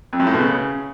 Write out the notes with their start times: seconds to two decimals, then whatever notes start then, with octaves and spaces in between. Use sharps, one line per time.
0.13 F2
0.20 F#2
0.27 A2
0.34 B2
0.41 C#3